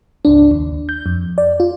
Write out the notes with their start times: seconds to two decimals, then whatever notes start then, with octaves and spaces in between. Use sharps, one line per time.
0.25 G#1 C#2 D4
0.51 D#2
0.89 G6
1.06 F2
1.38 D5
1.60 F4